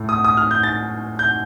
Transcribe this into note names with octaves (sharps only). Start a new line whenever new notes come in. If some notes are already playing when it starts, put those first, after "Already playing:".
Already playing: A2
D#6
D#6
F6
G6
A6
G6